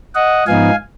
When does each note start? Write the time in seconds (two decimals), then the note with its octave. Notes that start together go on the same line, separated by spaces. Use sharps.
0.15 D#5 F#5
0.47 G#2 F3 B3 D#4 F5 G#5